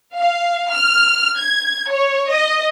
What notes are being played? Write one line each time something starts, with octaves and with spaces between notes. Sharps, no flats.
F5
F6
G#6
C#5
D#5